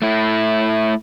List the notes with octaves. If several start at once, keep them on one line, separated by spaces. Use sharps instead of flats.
A3 E4